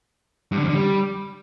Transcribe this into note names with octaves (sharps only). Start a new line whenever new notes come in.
G2
D3
F2
D3
G3